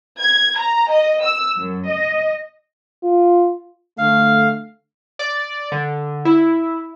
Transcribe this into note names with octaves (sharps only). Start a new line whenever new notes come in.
G#6
A#5
D#5
E6
F#2
D#5
F4
D3 A3 F5
D5
D3
E4